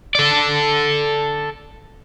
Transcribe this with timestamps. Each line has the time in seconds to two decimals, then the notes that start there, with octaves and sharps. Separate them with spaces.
0.15 A4 D5